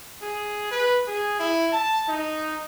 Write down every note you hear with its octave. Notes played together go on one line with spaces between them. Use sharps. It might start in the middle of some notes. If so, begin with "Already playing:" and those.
G#4
B4
G#4
E4
A5
D#4